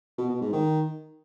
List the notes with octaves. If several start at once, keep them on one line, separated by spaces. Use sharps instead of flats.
B2
B2
G#2
D#3